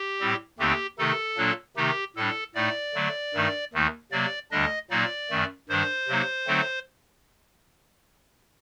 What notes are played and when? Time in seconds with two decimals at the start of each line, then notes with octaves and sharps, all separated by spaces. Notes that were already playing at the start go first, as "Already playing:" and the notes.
Already playing: G4
0.20 A2 G3 C4
0.59 D#2 D3 A3 C4 D#4 G4
0.98 C3 D#3 A3 D#4 A4
1.37 A#2 F#3 A#3 D4
1.77 C3 D#3 A3 D#4 G4
2.16 A2 G3 D4 A4
2.55 A2 A3 D#4 D5
2.94 D3 F#3 A3
3.34 G2 D#3 A3 D#4
3.73 D#2 D#3 A3 D#4
4.12 C3 F#3 A#3 D5
4.51 D2 D3 G3 D4 D#5
4.91 A#2 F#3 A#3 D#4 D5
5.30 F#2 D#3 A3
5.69 G2 D#3 G3 D4 C5
6.08 C3 F#3 A#3 D#4
6.47 D3 F#3 A3 C4 D#4